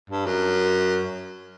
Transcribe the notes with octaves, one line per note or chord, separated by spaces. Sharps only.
G2
F#2